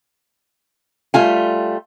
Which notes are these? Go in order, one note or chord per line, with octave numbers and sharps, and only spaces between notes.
G3 A3 F4 G#5